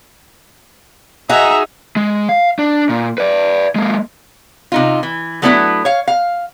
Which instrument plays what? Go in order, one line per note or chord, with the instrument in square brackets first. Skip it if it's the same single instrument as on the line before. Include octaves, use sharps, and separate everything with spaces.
[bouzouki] D#4 F#4 G#4 [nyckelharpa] E5 A#5
[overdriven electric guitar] G#3
F5
D4
A#2
B4 D5
G#3 A#3
[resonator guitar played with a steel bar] C3 D#4 F4
E3
F#3 A3 B3 D4 E4 B4
C#5 F5
F5